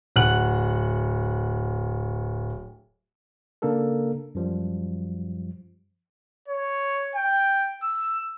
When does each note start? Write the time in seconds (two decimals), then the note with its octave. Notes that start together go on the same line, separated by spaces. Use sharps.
0.16 D1 F#5 F#6 F#7
3.62 C#3 A#3 D4 A4 A#4
4.35 F#2 F3 G3
6.48 C#5
7.16 G5
7.83 E6